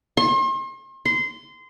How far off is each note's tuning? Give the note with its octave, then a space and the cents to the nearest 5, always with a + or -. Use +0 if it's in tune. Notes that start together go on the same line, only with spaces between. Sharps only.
C6 +40
C6 -20